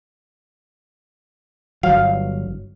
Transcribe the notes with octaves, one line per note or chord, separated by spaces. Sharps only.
G1 F#3 F5